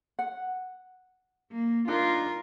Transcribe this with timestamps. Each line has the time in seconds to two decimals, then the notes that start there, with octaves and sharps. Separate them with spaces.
0.19 F#5
1.52 A#3
1.88 D4 D#4 F4 A#4